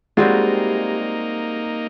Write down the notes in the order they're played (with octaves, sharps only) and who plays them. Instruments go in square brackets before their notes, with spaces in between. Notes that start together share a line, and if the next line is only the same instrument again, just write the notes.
[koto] G3 C4 F4 [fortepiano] G#3 F#4 [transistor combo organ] A#3 D#4